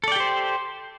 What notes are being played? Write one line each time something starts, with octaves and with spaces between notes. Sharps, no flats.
G4 A4 C5 D5 G5